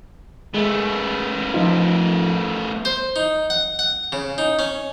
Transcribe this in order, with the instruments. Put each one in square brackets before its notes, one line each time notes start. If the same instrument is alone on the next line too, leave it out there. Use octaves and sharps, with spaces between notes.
[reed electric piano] G#3 [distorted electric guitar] A3 B3
[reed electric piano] F3 D#4 F4
[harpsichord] C5
D#4
F#5
F#5
C#3
D#4
C#4